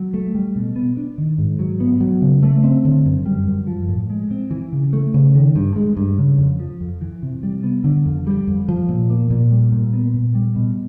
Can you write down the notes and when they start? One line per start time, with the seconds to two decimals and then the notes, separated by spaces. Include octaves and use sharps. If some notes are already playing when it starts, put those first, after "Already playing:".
Already playing: F#3
0.14 A3
0.35 G3
0.56 B2
0.76 B3
0.97 D4
1.18 D#3
1.38 G#2
1.59 F#3
1.80 B3
2.00 F#3
2.22 C#3
2.43 A3
2.64 C4
2.85 D3
3.06 F#2
3.26 G3
3.47 F#2
3.67 F3
3.88 A2
4.10 G#3
4.31 C4
4.51 E3
4.72 C#3
4.93 A3
5.14 C#3
5.35 D#3
5.56 G2
5.76 G#3
5.97 G2
6.18 C#3
6.38 F2
6.60 F3
6.81 F2
7.01 E3
7.22 C3
7.43 G3
7.64 B3
7.84 D3
8.06 F2
8.27 G3
8.47 F2
8.68 F3
8.89 A#2
9.10 A#3
9.30 A#2
9.51 G3
9.72 A#2
9.93 B3
10.14 A#2
10.35 G3
10.56 B2